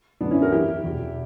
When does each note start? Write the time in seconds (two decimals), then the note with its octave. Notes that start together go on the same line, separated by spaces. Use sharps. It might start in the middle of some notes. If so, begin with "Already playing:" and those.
0.21 F#2 D3 B3 D4
0.31 C#4 E4
0.42 F#4 A#4
0.52 F#2 E3 E4 G4
0.83 E2 B2